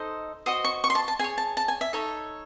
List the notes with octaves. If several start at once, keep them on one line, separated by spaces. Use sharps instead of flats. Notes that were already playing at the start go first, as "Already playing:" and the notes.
Already playing: D#4 A4 C5 D#5
F#4 C5 D#5 D#6
C#6
C#6
C6
A5
A5
G#4 C#5 G#5
A5
A5
G#5
E5
D#4 A4 C#5